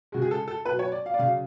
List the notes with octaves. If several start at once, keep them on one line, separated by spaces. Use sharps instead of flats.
C#3 G#3 F#4
G#4
A4
A4
B2 F#3 B4
C#5
D5
F5
D5
C#3 F#3 F5